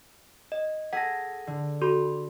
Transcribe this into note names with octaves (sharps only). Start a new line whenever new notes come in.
D#5
G#4 A4 F#5 A#6
D3
F#4 A4 C6